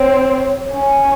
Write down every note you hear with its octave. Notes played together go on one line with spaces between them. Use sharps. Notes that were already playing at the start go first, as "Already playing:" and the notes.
Already playing: C4 C#5
C#4